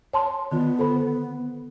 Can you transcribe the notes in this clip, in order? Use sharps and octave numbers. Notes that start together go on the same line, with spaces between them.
C#5 A5 C6
D3 D#3 B3 F4
A4 C5 B5